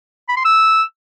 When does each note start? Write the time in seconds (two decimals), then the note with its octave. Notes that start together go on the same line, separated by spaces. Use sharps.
0.29 B5
0.37 C6
0.45 E6